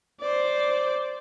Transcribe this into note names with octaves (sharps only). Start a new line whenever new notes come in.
C5 D5